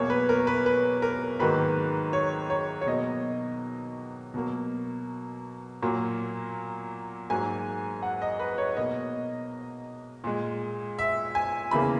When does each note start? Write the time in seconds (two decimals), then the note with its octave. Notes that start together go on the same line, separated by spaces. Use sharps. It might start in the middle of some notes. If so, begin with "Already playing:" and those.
Already playing: E2 B2 F#3 A#3 C#5
0.10 B4
0.29 A#4
0.47 B4
0.66 B4
1.02 A#4
1.39 G#2 D#3 F#3 A#3 B4
2.13 C#5
2.50 C#5
2.81 C#5
2.86 B2 F#3 A#3 D#5
4.34 B2 F#3 A#3
5.82 A#2 F#3 A#3
7.30 G#2 F#3 A#3 G#5
8.03 F#5
8.22 D#5
8.39 B4
8.58 C#5
8.77 B2 A#3 D#5
10.24 A#2 G#3
10.99 E5
11.35 G#5
11.71 E2 C#3 E3 A#3 B5